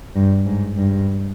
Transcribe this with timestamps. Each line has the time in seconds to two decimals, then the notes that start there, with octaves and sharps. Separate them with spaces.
0.15 G2
0.46 G#2
0.77 G2